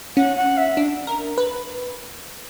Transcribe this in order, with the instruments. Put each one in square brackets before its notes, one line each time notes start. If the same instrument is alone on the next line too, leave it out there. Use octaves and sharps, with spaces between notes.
[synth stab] C#4 [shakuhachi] F#5
[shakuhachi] F#5
E5
[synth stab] D4
A#4
B4